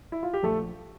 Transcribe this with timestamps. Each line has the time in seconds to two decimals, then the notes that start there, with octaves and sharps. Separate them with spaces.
0.12 E4
0.23 F4
0.33 G4
0.43 A#1 A3 A4